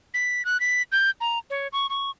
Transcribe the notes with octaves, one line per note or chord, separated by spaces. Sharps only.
B6
F#6
B6
G6
A#5
C#5
C#6
C#6